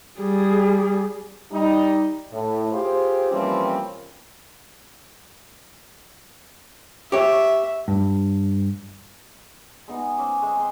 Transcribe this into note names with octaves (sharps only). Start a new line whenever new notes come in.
G3 G#4
G3 D#4
A2
F4 G4 G#4 C5
E3 F3 G3 A#3 C4 C#4
G4 C#5 E5
G2
G#3 B3 D#4 F#4
C#4 C5 D6
G#3 C5
C4 C6